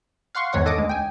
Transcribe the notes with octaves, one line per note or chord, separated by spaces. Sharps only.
F5 F#5 C6 C#6
E2 G#2 D#3 C#5 F#5
A4 D#5 D6 D#6
D2 G#3
G5 G#5